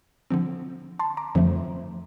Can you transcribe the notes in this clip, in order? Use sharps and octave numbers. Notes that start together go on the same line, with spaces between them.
D3 F3 C4
A5 C6
A#5 D6
F2 D3 F3 A3